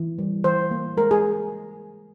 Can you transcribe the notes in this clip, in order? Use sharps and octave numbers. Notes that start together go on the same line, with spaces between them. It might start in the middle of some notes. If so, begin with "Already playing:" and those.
Already playing: E3
G3
E3 C5
A#3
G#3 A#4
G#4